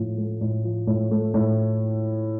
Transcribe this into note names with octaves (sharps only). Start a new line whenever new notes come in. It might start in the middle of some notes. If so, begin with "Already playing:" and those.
Already playing: A2 F3
A3
A2
F3
A2
A3
A2